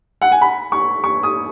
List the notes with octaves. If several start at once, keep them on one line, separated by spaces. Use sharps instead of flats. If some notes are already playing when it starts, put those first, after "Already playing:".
F#5
G#5
B5
C#6
C#6
D#6